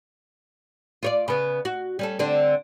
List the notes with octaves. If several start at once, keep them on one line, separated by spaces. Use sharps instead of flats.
F4 C#5 D5
C#3 B3
F#4
G3 C#4 A4
D3 C4 D4